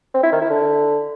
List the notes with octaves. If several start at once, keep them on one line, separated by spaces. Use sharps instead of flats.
C4
E4
D#3
E4
D3